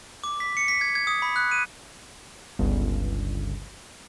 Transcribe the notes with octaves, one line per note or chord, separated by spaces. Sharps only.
D6
B6
C#7
B6
G#6
G#6
D#6
B5
F#6
D#7
G1 C#2